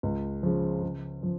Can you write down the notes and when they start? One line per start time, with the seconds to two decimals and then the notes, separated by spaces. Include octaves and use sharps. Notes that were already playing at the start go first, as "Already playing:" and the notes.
0.03 C#2
0.43 C#3 F3
0.83 C#3
1.23 F3